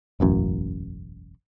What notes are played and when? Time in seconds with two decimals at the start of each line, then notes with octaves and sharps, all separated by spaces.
0.20 E1 A1 F#2